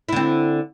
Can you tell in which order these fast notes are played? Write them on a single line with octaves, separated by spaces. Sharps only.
E4 D3 C4